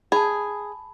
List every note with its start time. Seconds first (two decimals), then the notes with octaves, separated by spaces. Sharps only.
0.12 G#4 A5 B5